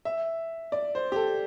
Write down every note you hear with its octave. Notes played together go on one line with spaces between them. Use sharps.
E5
D5
C5
G4
A4